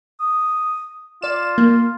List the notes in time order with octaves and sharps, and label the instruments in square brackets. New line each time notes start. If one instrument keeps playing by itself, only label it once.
[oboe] D#6
[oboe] F4 [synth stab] D5 E7
[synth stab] A#3